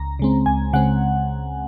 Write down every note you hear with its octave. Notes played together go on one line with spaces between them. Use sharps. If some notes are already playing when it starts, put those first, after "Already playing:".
Already playing: C#2 A#5
C#3 G#3 C4
C#2 G#5
C#3 G#3 C4 F#5